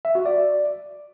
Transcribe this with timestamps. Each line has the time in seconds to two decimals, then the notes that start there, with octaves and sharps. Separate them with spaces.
0.05 E5
0.15 F#4
0.26 D5